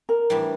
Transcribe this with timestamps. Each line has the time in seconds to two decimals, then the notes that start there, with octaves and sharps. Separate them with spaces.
0.09 A#4
0.30 A2 E3 G3 D4